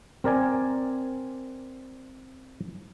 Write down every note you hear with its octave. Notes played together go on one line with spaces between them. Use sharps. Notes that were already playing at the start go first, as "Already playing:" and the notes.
C4 A#4 D5 G#5